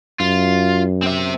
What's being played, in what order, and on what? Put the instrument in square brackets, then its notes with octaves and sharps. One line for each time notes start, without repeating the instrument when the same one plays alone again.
[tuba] F#2 [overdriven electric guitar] F4
[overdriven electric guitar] C4 E5